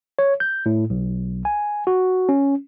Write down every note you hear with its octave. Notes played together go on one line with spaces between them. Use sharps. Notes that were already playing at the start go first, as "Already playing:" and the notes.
C#5
G6
A2
B1
G#5
F#4
C#4